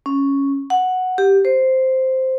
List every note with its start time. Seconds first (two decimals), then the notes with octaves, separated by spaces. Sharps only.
0.06 C#4
0.70 F#5
1.18 G4
1.45 C5